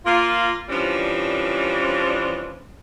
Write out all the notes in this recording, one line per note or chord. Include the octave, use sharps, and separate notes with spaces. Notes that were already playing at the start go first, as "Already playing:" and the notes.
A#3 F4
E3 F3 G3 C#4 D4